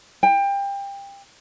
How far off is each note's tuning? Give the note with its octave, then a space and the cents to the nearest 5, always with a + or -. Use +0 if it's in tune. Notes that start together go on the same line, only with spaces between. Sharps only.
G5 +25